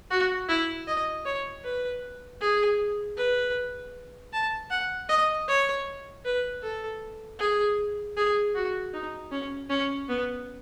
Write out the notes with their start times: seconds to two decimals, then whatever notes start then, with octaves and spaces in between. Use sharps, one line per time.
0.11 F#4
0.49 E4
0.88 D#5
1.26 C#5
1.64 B4
2.41 G#4
3.17 B4
4.33 A5
4.71 F#5
5.09 D#5
5.48 C#5
6.25 B4
6.63 A4
7.39 G#4
8.17 G#4
8.55 F#4
8.94 D#4
9.31 C#4
9.70 C#4
10.09 B3